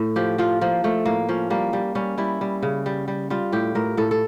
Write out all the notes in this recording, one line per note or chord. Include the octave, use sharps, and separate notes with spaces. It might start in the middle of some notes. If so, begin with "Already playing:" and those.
Already playing: A2
F3 G4
F3 F4
F3 A#3
F3 A3
A2 A#3
F3 C#4
G3 A#3
G3
G3 C#4
G3 E4
G3
C#3
G3
G3
G3 F4
A2 G4
A2 A#4
A2 A4
A4